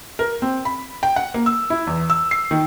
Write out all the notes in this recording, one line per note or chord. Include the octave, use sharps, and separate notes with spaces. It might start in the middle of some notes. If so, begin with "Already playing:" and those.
A#4
C4
B5
G5
F#5
A#3
E6
E4
E2
E6
C7
D#3